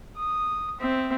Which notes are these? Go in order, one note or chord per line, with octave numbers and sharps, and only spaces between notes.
D#6
C4 E5